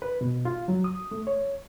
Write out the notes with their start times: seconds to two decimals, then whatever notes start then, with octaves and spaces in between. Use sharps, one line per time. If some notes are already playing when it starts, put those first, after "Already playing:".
0.02 B4
0.21 B2
0.45 F4
0.68 F#3
0.84 D#6
1.11 A3
1.27 C#5